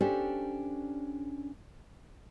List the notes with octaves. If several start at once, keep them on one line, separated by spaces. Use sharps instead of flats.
C#4 D4 G4 A4 C5 D5